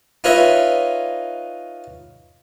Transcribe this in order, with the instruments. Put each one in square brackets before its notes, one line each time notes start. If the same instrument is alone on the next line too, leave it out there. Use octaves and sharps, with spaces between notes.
[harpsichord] D#4 F4 B4 C#5 D#5 E5